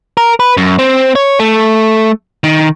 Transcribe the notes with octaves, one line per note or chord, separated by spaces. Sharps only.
A#4
B4
F#2
C4
C#5
A3
D#3